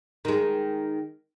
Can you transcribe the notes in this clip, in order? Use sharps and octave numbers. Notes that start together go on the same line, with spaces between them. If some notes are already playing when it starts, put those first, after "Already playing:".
D#3 G#3